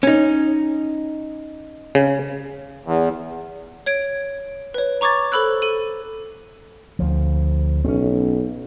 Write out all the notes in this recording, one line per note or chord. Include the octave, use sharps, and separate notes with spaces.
C#4 D#4
C#3
E2
C#5 G#6 D7
B4 C#5
A#5 C#6 D6 G#6 A6
A4 C5 B5 E6 F#6
A4 D#7
D2 F3
B1 C4 C#4